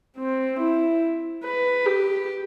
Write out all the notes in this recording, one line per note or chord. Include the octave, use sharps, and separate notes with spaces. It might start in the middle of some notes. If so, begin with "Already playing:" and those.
C4
E4
B4
G4